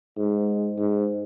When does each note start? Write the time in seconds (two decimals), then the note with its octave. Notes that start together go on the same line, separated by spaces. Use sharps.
0.17 G#2
0.78 G#2